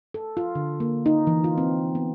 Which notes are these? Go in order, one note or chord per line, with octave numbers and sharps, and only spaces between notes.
A4
F4
D3
A#3
D#4
E3
F4
C4
B3